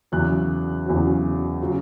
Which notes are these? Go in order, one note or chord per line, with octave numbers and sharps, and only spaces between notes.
E2 C#3 F#3 F#6
E2 C#3 F#3
C#3 F#3